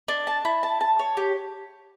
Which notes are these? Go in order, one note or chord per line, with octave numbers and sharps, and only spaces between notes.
D4
A5
E4
A5
A5
C#5
G4